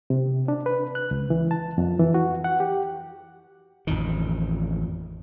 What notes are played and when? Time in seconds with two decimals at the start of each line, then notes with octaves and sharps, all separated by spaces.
0.10 C3
0.48 D4
0.66 B4
0.95 F#6
1.11 C#2
1.30 E3
1.51 A5
1.78 F2
1.99 E3
2.14 F#4
2.44 F#5
2.60 G4
3.87 A1 F2 D#3